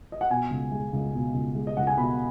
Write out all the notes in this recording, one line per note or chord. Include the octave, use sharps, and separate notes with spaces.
D#5
F#5
B2 G#5
C#2
G#3
C#2
B2
C#2
G#3
D#5
C#2 F#5
G#5
B2 B5